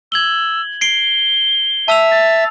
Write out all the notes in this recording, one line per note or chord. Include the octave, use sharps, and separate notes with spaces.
E6 G#6 F#7 G7
C7 D7 G7
E5 A5 E6 F7
A6